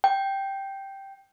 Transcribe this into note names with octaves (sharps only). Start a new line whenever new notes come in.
G5